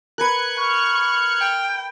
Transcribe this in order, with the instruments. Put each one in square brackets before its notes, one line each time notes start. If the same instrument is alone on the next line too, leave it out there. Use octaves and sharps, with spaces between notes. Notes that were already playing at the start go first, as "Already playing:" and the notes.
[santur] A#4 B4 [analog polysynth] F#6 G#6 C#7
[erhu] C#6 [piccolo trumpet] F6
[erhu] G5